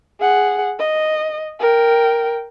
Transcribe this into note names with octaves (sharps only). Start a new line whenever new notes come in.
G#4 F#5
D#5
A#4 G5